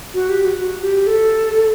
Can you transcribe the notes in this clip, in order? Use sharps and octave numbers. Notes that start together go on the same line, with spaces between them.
F#4
G4
F#4
F#4
G4
A4